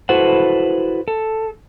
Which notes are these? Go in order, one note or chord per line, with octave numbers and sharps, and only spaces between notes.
E4 F#4 A4 B4 C5 F#5
A4